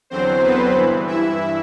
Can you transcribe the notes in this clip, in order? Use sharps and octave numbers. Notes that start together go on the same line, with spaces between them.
E2 D3 F#3 C4 C5
B3 B4
G2 E3
E4 E5